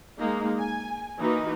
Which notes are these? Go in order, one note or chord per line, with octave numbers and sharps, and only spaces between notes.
G#3 A#3 D#4
G#5
E3 A#3 D#4 F#4